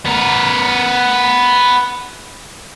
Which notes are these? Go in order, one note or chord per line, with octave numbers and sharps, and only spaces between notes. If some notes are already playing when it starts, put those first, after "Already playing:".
B3 A#4